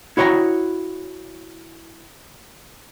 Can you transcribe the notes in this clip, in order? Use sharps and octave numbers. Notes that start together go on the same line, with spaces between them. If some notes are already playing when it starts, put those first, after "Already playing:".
E4 F#4 C#5 G5 A#5